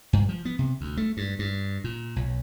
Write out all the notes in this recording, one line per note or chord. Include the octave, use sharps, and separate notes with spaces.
G2
F3
B3
C3
D2
A3
G2
G2
A#2
B1